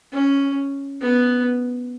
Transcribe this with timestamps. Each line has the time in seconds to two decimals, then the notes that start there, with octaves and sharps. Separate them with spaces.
0.12 C#4
1.01 B3